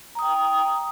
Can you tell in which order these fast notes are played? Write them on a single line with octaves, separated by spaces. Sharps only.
A#5 D#6 G5